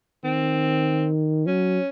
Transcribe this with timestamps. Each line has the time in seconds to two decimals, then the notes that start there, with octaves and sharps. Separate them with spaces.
0.24 D#3 C4
1.47 F#3 C#4